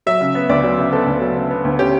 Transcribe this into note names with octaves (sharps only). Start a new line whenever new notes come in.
F#3 E5
C#3
B3
D2 D5
F#3
C#3
B3 A4
D2
F#3
C#3
B3
D2
C#4 G4